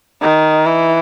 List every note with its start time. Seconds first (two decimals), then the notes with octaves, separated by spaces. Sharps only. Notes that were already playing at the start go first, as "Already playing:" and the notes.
0.22 D#3
0.66 E3